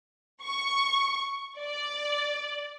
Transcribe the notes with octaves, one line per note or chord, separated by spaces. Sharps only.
C#6
D5